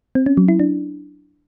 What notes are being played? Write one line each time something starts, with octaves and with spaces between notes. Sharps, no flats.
C4
C#4
F#3
E4
D4